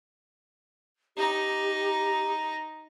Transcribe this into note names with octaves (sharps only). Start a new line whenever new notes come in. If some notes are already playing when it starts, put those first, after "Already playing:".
D#4 G4 A#5